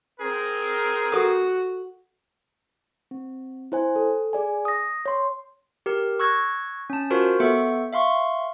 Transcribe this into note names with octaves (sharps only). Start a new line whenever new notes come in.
C4 G#4 A#4
F#4 A4 D#6
C4
E4 C5 G#5
A4
G#4 D5 G#5
D#6 A#6
C#5 C6
G4 A#4
C#6 E6 F#6 G#6 A#6
C#4 A5
F4 F#4 A#4 C5
B3 A4 E5 C#6 G6 C#7
E5 F5 C6 C#6